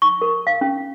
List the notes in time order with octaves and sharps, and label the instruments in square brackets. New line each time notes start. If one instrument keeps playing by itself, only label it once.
[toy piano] C#6
A#4
F5
C#4